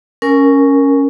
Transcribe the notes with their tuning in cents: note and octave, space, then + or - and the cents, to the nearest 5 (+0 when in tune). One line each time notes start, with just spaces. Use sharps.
C#4 +0 A#4 +0 G#5 +0